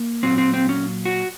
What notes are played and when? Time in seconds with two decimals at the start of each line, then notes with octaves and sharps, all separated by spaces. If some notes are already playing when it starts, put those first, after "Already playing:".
Already playing: A#3
0.23 A#2 F#3 C4
0.38 C4
0.53 C4
0.69 C#4
1.05 F#4